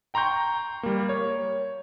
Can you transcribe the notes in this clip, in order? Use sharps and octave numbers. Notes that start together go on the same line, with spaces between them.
G5 A#5 C6 C#6 G6
G3 A#3
C#5